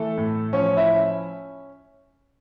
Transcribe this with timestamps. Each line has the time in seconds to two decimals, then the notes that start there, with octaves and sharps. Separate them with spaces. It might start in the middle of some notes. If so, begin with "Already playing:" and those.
Already playing: E3 A3 A4
0.18 A2
0.53 F3 C#4 C#5
0.77 E4 E5
0.90 C#4